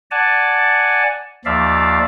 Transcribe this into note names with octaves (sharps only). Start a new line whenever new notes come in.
D5 F#5 G#5 A5
D#2 F3 D5 E5 F5